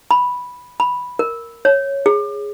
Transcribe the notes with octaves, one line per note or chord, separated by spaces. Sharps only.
B5
B5
A#4
C#5
G#4